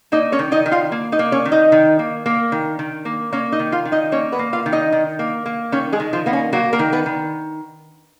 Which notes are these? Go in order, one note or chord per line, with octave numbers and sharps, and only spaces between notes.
A#3 D#4 D#5
C#4 C#5
D#3
D#4 D#5
D#3
F4 F5
A#3
D#4 D#5
A#3
C#4 C#5
D#3
D#4 D#5
D#3
A#3
A#3
D#3
D#3
A#3
A#3 C#4 C#5
D#4 D#5
D#3
F4 F5
D#3
D#4 D#5
A#3 C#4 C#5
B3 B4
A#3
F4 F5
D#3
D#4 D#5
D#3
A#3
A#3
D#3 C#4 C#5
G#3 G#4
D#3
F3 F4
A#3 B3
C#4
F#3 A#3 F#4
A#3 A#4
D#3
B3 B4
D#3